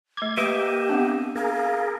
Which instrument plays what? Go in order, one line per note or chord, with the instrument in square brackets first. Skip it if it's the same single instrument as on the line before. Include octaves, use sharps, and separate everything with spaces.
[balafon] A3 D6 [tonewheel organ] G#6
[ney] A#3 [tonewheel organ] G4 [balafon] B4 [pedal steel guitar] D#5 E5 D6
[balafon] B3 C4 D4
[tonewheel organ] G#4 A#4 [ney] F5